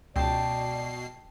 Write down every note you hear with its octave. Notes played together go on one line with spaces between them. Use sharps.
C#2 B2 D5 G5 A5 C7